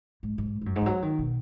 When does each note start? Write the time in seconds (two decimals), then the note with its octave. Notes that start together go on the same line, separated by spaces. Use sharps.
0.23 G#2
0.38 G#2
0.61 G#2
0.66 F#2
0.76 G#2
0.81 E3
0.86 F#3
1.02 D#3
1.19 B2